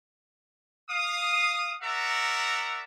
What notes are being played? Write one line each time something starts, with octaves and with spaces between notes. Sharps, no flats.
F5 D#6
F#4 A#4 D5 E5 F#5 A#5